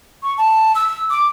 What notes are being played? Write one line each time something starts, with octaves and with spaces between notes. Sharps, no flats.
C#6
A5
E6
D6